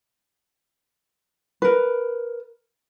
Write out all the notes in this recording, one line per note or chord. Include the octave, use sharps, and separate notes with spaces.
A#4 B4